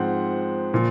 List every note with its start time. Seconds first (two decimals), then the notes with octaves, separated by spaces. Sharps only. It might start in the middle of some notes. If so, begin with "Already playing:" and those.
Already playing: G#2 F3 C4 F#5
0.74 A#2 F3